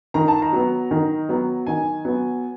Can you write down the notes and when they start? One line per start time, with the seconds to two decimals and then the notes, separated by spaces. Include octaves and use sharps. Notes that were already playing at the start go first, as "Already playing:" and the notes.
0.14 D#3 A#5
0.28 A5
0.42 A#5
0.53 F#3 B3
0.91 D#3
1.29 F#3 B3
1.67 D#3 G#5
2.05 F#3 B3